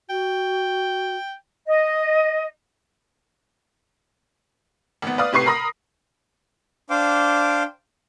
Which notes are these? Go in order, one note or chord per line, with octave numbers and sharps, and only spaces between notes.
F#4 G5
D#5
G#1 B3
B4 D5 F5 D#6
A2 C3 B4 C#6 C7
A#4 A#5 B5 D#6 A#6
D4 C5 F5 G5 D6